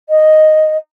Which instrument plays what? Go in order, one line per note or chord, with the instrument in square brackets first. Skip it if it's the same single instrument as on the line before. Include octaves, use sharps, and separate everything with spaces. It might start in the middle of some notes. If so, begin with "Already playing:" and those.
[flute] D#5